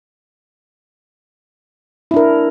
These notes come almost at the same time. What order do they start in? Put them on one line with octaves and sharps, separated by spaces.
E4 D4 A#4